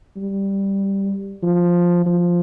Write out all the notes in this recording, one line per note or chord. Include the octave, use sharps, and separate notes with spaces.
G3
F3
F3